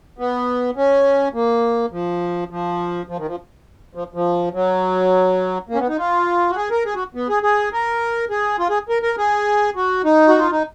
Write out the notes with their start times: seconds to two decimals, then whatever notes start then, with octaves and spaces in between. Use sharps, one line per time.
0.18 B3
0.76 C#4
1.34 A#3
1.92 F3
2.51 F3
3.09 F3
3.18 D#3
3.27 F3
3.95 F3
4.14 F3
4.54 F#3
5.69 A#3
5.74 C#4
5.79 B3
5.88 D#4
5.99 F4
6.50 F#4
6.56 G#4
6.71 A#4
6.86 G#4
6.95 F#4
7.15 B3
7.29 G#4
7.43 G#4
7.73 A#4
8.30 G#4
8.59 F4
8.70 G#4
8.89 A#4
9.03 A#4
9.18 G#4
9.76 F#4
10.04 D#4
10.28 F#4
10.39 F4
10.51 D#4